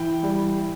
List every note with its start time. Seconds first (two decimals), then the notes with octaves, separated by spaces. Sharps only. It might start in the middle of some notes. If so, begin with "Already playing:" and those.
Already playing: E3 G5 B5
0.23 G3